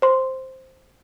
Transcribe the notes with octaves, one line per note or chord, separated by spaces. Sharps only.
C5 C6